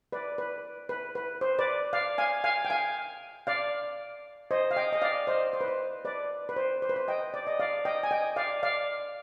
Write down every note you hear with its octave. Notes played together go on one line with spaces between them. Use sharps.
B4 D5
B4
B4
B4
C5
B4 D5
D5 F5
F5 G#5
F5 G#5
G5
F5 G#5
D5 F5
C5 D#5
F5
D#5 G5
D#5
D5 F5
C5 D#5
C5
B4
C5
B4 D5
B4
C5
C5
B4
C5
D#5 G5
D5
D#5
D5 F5
D#5 G5
G#5
D#5 G5
D5 F5
D5 F5